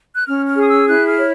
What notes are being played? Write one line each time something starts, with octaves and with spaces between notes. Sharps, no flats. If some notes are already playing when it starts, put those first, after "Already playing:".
F#6
C#4 F6
F6
G#4 D#6
E6
E4 F#6
F6
C#5